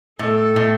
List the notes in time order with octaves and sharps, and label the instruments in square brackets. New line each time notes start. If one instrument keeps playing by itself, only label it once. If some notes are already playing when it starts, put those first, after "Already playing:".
[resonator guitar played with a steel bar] A2 [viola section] A4
[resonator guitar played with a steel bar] A2